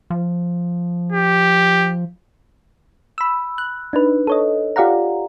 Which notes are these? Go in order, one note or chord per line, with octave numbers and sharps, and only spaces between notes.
F3
G4
B5 E6
F#6
D4 D#4 B4
A4 C#5 D#5
F4 G4 D5 F5 F#5 A#5